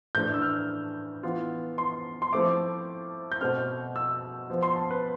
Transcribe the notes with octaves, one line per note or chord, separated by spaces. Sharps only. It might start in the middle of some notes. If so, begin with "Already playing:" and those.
A2 E3 A3 D4 G6
E6
F6
E3 B3 F4
C6
C6
F3 A3 C4 E4 D6
G6
B2 A3 C4 F6
E6
F3 B3 F4
C6
A5
B4